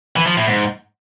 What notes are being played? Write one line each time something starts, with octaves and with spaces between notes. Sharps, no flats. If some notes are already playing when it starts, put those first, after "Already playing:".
E3
F3
A2
G#2